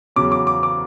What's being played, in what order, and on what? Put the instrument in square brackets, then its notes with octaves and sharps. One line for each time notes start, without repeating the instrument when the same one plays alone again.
[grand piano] E2 C#3 F#3 D6
D6
D6
D6